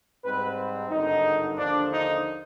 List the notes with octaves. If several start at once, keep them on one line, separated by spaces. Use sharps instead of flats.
G#2 G3 C4 B4
G#1 G2 D3 D#4
D#2 D3 F3 D4
D#4